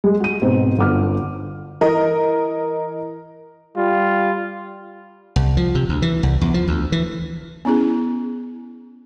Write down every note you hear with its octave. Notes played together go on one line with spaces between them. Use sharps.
G#3
F#4 D#7
G#2 B2 C4
G1 F#5 D6 F6
E3 A#4 D#5
G3 F4
C2
F3
C3
D2
E3
C2
E2
F3
D2
E3
B3 C#4 E4 G#4